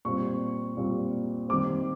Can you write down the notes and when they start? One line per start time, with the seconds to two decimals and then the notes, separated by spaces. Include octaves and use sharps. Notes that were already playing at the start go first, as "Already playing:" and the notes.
0.05 A#2 G3 C4 C#6
0.77 A#2 G3 C4
1.49 D#3 G3 C4 D6